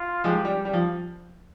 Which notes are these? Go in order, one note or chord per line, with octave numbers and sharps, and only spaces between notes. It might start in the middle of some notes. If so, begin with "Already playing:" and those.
Already playing: F4
F3 G#3 G4
G3
G3
F3